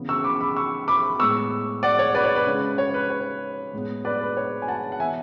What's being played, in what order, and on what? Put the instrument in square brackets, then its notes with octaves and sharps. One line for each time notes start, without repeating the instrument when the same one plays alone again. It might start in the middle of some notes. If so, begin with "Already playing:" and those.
Already playing: [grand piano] C#3 E3 B3
C#6 E6
B5 D6
B5 D6
C#6 E6
B5 D6
A2 G#3 B3 C#6 E6
D5 F#5
C#5
B4 D5
C#5
B4
C#3 G#3 C#4
C#5
B4
C#5
A2 G#3 B3
B4 D5
B4
C#5
G#5
F#5 A5
F#5
E3 E5 G#5
B3